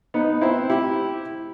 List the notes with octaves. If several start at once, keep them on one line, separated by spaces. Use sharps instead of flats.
B3 D#4
C4 E4
E4 G4